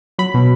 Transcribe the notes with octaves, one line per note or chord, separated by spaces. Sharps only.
F#3 B5
B2